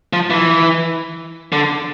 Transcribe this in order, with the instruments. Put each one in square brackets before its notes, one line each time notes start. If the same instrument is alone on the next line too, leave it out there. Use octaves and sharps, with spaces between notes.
[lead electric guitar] F3
E3
D3